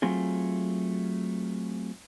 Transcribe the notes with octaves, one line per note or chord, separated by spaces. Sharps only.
F#3 A3 C4 F4 G#4